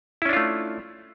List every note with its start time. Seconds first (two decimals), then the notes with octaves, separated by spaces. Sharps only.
0.22 E4
0.25 C#4
0.29 D4
0.33 F4
0.37 A3